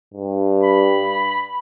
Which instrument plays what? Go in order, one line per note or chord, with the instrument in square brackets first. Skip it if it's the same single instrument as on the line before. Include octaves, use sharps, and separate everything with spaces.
[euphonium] G2
[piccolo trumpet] B5